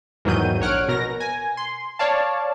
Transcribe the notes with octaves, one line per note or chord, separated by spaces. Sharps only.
E2 G#2 D#3 F#3 G6 D#7
A#1 C#5 F#5 F6 D7
B2 A#4 A#6
G#5
C6
C#5 D5 F5 A5